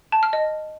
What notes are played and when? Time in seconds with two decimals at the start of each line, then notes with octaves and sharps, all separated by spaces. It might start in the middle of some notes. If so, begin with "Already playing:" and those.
0.12 A5
0.23 F6
0.33 D#5